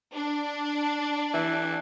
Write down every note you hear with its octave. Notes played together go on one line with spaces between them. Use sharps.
D4
E3